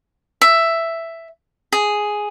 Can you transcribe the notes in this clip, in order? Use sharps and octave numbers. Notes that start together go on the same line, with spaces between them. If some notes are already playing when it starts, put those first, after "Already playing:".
E5
G#4